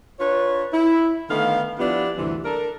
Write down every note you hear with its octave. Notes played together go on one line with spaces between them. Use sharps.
D4 F4 B4 C#5
E4
D3 D#3 A3 B3 F5
F3 B3 D4 E4 F4 G4
D2 G2 C3 E3
D4 A4 A#4